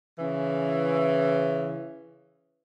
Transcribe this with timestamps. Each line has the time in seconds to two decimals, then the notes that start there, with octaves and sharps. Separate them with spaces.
0.19 C#3 E3